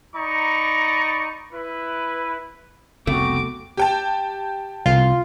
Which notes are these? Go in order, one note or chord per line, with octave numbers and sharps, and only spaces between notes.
D#4 D5 A#5 B5 C#6
E4 B4
F1 C2 C#3 A3 B3 C4 F#4 D6
G4 G5 A5
C2 F4